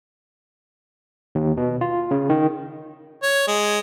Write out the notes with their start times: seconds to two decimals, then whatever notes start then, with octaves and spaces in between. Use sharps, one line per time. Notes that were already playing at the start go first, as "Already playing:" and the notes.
1.35 D#2
1.57 B2
1.81 F4
2.11 C#3
2.29 D#3
3.23 C#5
3.47 G#3